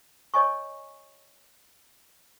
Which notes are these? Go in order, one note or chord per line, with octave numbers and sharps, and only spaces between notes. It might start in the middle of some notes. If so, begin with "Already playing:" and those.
C#5 D#5 G#5 C#6